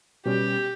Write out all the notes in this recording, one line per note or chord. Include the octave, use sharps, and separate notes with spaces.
B2 G3 C#4 G4